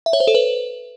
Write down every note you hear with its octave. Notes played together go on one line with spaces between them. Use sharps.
E5
C#5
C5
A4
B4